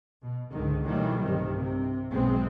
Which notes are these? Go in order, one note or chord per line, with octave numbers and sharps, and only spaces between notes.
B2
C#2 G#2 D3 D#3
B2 D#3 E3 F#3 G3 A3
B1 G2 C3 D#3
C3
B1 G#2 G#3 B3 C4